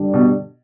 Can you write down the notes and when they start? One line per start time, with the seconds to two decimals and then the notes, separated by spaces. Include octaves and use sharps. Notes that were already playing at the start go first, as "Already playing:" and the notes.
Already playing: G2 D3 G3 D4
0.14 B2